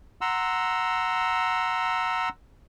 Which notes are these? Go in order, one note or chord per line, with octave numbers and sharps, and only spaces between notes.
F#5 A#5 C6 E6